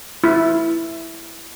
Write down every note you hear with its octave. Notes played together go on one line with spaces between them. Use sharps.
E4